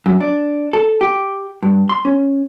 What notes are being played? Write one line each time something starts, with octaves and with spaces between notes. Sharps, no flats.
F#2
D4
A4
G4
G2
C6
C#4